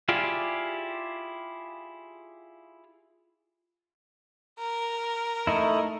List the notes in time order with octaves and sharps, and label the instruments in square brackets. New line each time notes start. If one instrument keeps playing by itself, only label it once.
[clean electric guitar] E4 F4 G4 G#4 D5
[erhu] A#4
[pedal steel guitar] A3 D#4 E4